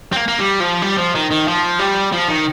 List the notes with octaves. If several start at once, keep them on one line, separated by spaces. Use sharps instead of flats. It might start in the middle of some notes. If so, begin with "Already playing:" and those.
C4
A#3
A#3
G3
F3
G3
F3
D#3
D#3
F3
G3
F3
D#3